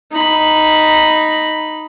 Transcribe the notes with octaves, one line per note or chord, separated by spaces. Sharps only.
D#4 B5